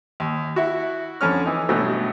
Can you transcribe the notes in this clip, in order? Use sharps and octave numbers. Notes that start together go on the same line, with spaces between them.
D#2
E4 F#4
F2 D3 C#4 F6
E3 D#4
A1 G2 B2 F#3 A3